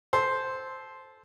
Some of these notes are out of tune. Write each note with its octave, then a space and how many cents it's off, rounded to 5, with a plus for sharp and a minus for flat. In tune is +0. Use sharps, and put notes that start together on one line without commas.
A4 -15 C5 +0